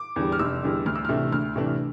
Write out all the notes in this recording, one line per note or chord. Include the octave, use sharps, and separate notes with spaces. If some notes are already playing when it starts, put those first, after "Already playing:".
Already playing: D6
E2 D3 G3
F6
F1 E6
E2 D3 G3
D2 F6
E6
C3 E3 A3 D4 F6
D2 F6
C3 E3 A3 D4